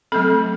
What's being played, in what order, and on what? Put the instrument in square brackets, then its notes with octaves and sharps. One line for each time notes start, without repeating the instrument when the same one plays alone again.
[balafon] F#3 A3 C4 A4